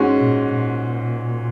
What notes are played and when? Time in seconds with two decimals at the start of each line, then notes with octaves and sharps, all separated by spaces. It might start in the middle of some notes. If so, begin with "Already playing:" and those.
Already playing: G#2 G#3 C#4 F#4
0.18 A#2
0.54 A#2